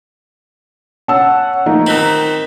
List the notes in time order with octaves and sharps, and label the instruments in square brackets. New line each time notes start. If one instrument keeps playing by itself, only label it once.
[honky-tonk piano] C#4 [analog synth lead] F#5 [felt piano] A5 E6
[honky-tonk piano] F3 A3 A#3 [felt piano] D#4
[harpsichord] D#3 C4 [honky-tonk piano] A#5 F#6 F#7 [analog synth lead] B6